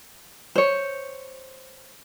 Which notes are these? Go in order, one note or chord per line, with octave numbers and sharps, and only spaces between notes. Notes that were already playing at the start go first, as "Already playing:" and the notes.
C5 C#5